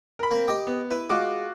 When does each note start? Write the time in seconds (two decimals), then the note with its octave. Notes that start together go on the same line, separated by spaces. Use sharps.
0.19 A#4 B5
0.31 A#3 C4
0.48 G4 D#5 G5 D6
0.67 B3
0.91 E4 B4
1.10 G#3 F4 F#4 D6